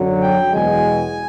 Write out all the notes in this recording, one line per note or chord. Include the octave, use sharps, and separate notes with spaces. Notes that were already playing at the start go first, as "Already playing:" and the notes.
Already playing: F#2 D3 F#3
G5
E2 B2 G#3 G#5